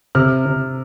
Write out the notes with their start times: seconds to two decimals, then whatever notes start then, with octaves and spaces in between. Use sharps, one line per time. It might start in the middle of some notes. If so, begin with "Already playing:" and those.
0.15 C3 F6
0.46 C3